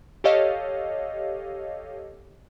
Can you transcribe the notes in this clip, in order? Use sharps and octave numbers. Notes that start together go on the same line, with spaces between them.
G4 A4 C#5 D#5 F5